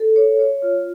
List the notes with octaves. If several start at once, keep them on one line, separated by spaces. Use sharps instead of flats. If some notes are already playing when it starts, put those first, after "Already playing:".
Already playing: A4
C#5
C#5
F4